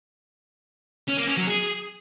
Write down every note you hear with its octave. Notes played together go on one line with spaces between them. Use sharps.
C#4
A#3
C#4
F#3
G#4